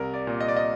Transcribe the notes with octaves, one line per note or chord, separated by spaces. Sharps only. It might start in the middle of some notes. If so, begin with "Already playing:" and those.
Already playing: C2 A#4
D5
A#2
D#5
D5
D#5